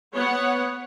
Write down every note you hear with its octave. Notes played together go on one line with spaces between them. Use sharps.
B3 C#5 F#5